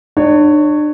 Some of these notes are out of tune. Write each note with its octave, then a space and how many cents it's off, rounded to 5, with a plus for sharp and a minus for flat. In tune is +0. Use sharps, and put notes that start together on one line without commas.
D4 +35 C#5 +0